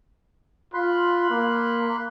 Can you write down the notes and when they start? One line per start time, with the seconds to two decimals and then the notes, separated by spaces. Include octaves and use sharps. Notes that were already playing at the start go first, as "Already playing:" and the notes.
0.74 F4 B5 C6 F#6
1.30 A#3